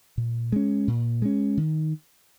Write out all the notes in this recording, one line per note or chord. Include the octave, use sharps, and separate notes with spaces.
A#2
G#3 C#4
A#2
G#3 C#4
D#3